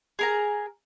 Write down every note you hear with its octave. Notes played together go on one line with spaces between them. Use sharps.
G#4 A#4 A#5